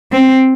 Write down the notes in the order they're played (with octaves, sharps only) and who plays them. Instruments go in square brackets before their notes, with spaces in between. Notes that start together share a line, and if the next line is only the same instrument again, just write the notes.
[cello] C4